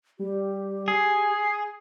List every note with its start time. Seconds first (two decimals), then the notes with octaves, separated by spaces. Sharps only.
0.19 G3 G4
0.88 G#4 C7